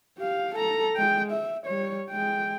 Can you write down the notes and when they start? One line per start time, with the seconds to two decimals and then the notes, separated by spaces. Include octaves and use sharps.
0.17 G4 F5
0.55 A4 A#5
0.96 G#3 G5
1.32 E5
1.66 G3 C#5
2.10 G#3 G5